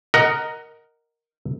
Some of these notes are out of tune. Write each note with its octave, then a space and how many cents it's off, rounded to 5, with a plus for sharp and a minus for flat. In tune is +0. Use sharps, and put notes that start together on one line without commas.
A#4 +0 D#5 +5 F#5 +15